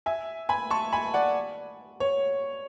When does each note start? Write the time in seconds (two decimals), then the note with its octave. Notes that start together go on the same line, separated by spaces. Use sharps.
0.06 E5 G#5
0.49 G#5 B5
0.70 A5 C#6
0.93 G#5 B5
1.14 D5 F#5
2.00 C#5